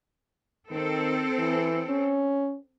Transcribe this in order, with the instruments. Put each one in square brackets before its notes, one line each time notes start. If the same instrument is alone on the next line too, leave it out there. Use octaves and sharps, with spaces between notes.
[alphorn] D#3 [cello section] C4 A4
[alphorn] E3
C#4